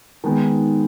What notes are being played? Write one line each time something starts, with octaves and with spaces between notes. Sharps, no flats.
D#3 G#3 B3